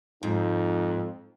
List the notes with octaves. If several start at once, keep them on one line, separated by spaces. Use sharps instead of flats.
F2 G#2 D#4